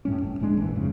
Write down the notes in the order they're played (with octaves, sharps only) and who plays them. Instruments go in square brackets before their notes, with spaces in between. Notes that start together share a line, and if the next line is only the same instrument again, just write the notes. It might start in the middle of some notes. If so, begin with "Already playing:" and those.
[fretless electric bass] F#2 A2 G3 C#4
G1
D1 A2 G#3 D4
A#1 E3
F2 G#2 C#3